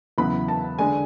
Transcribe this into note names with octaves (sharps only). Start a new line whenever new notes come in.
E2 C#3 F#3 B3 E4 B5
A5
D3 G#3 D4 G#5